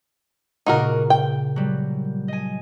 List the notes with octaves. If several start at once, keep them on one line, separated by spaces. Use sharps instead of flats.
A#2 C#3 A#3 D#4 F#4 A#4
G5
F#3 G3
D#5 G#5